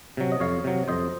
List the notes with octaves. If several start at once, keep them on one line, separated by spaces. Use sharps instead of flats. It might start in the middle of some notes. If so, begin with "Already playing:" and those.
C3 F#3
D#5
F2 C#5 F5
C3 F#3
F2 C5 D#5